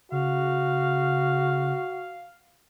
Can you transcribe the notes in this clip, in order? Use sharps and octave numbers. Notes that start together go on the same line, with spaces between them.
C#3 F#4 F5